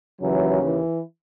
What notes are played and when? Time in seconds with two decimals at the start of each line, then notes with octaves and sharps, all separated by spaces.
0.20 D#2 C#3 E3 F#3
0.62 E3